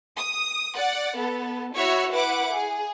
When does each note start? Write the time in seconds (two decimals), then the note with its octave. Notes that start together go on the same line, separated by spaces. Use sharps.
0.17 D#6
0.75 D5 F#5
1.18 B3 A4
1.75 E4 F#4 C#5 E5
2.12 E4 B4 F#5 D6
2.54 G#4